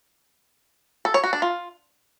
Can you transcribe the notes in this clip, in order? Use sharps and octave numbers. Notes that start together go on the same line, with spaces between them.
A4
C#5
F#4
D4
F4